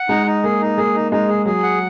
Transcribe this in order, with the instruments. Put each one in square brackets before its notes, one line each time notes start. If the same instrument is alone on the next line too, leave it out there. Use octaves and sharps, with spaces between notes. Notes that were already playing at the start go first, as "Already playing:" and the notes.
Already playing: [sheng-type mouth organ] F#5
[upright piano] G#3 [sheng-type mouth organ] D#4
[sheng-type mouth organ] D#4
[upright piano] A#3 [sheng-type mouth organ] G#4
[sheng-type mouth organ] D#4
[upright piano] A#3 [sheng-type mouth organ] G#4
[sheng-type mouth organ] D#4
[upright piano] G#3 [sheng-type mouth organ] D#4
[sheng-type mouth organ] G#4
[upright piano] F#3 [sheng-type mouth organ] G#4
[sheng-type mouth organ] F#5